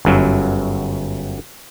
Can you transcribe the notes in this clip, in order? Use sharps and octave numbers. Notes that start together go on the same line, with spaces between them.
G1 F#2 F#3